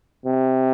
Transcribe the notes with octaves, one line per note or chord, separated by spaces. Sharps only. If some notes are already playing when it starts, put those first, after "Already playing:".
C3